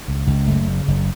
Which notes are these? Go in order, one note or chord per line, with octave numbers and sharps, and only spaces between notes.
C#2
C#2
F#1 A3
C#3
F#1